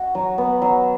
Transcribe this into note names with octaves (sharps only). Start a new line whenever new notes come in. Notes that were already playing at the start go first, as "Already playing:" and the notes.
Already playing: F#4
F#3
B3
F#3